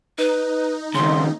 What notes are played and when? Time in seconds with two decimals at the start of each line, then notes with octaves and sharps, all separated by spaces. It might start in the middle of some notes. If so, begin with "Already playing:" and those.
0.18 D#4 B4
0.94 D#2 C#3 C6